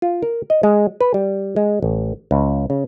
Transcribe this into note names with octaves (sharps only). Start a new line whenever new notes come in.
F4
A#4
D#5
G#3
B4
G3
G#3
A1
C#2
C#3